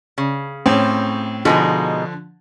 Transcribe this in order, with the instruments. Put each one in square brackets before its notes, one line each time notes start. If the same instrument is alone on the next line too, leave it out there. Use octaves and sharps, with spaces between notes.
[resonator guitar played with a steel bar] C#3
[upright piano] A2 C4 C#4
[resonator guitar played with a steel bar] B2 G#3 D#4 [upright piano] D3 F3